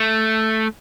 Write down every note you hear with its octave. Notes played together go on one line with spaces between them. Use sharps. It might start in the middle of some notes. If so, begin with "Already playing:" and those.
Already playing: A3